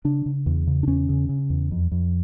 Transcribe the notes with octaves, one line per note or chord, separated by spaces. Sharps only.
C#3 D4
C#3
E2
C#3
D4
E2 C#4
C#3
C#3
E2
F2
F2